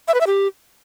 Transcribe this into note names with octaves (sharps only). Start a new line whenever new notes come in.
E5
B4
E5
G4